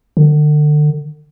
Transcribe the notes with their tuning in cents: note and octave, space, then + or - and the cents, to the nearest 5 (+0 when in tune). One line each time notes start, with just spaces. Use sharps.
D3 +35